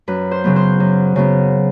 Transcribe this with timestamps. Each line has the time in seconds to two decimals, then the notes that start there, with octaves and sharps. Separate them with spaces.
0.08 F#2 B4
0.31 C5
0.44 C#3 F#3 B3
0.56 C5
0.80 F#2
1.16 C#3 F#3 B3